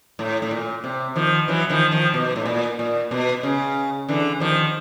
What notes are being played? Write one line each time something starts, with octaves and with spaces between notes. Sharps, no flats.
A2
A2
A#2
C3
D#3 F3
E3 F#3
D#3 F3
D#3 F3
B2
A2
A#2
A#2
B2
C#3
D3 E3
D#3 F3